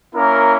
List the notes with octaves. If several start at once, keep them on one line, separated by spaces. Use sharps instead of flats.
A#3 C#4 E4 A#4